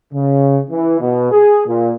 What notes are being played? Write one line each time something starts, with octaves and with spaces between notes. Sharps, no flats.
C#3
E3
B2
G#4
A#2